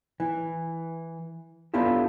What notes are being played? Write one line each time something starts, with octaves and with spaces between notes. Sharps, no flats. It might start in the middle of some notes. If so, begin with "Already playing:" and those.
E3
B3 D4 E4 F4 G4 A4